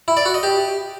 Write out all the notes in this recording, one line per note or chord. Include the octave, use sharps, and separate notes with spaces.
E4
D5
F#4
D#5
G4